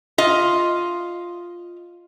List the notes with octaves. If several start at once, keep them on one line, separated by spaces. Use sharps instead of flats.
F4 D#5